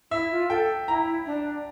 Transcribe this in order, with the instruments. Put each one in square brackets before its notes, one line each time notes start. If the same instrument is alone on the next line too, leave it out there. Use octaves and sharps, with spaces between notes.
[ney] E4 [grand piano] E5
[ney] F4
[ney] A4 [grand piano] G5
[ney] E4 [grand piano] A#5
[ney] D4